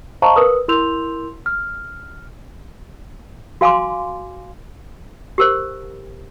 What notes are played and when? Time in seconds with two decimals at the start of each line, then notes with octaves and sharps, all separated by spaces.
0.22 C5 D#5 F5 A5 A#5 C#6
0.36 A#4 B4 D#6
0.68 E4 A#4 C6 E6 G6 F7
1.46 F6
3.61 F#4 F5 G#5 C6 D6
5.38 G4 A#4 C5